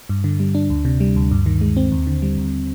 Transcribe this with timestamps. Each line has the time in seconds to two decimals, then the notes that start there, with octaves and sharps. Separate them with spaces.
0.09 G2
0.24 D3
0.40 G3
0.55 D4
0.70 D2
0.85 C3
1.00 G3
1.16 D2
1.31 G2
1.46 D#3
1.61 G#3
1.77 C4
1.92 D#2
2.07 D3
2.22 G3
2.37 D#2